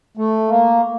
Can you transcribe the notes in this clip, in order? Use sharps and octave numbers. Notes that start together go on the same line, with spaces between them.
A3
A#3